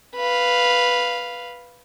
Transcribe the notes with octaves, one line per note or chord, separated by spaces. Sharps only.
B4 F5